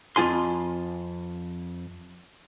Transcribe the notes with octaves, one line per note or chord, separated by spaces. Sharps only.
F2 A#3 F4 G#5 C6